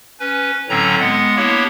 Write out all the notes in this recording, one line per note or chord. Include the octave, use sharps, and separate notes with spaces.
C#4 B4
A2 D3 F#3 C4 C#4 A#5
G#3 B3 F#5
A#3 B3 D4 E4 G4 C#5